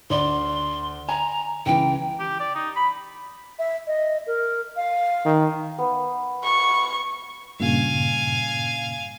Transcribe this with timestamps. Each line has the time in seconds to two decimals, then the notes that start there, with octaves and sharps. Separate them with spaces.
0.10 D2 D5 C6
1.09 G#5 A#5
1.66 C#2 E3 G5
2.20 G4
2.40 D5
2.55 D#4
2.76 B5
3.59 E5
3.87 D#5
4.26 A#4
4.76 F5
5.25 D#3
5.78 B3
6.43 C#6
7.60 G2 A#2 C#3 F5 G#5